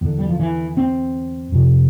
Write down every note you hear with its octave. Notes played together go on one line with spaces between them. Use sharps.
E2 D3
G3
F3
E3
C4
F2 C3